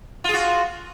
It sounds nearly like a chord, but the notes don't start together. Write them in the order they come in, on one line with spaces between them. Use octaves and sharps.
F4 G#4 F#4